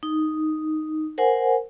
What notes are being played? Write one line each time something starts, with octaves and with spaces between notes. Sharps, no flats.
D#4
A#4 C5 F#5 G#5